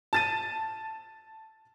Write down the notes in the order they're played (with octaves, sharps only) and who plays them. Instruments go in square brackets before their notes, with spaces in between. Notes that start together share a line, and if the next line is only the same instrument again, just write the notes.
[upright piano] A5 A6 D#7